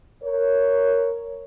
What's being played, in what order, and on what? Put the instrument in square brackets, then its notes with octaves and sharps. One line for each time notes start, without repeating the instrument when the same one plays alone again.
[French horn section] A#4 C#5